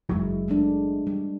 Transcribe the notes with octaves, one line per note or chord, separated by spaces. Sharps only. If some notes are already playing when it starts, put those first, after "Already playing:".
F#1 D#2 F#3 G#3 E4
G#3 A3 D4
G3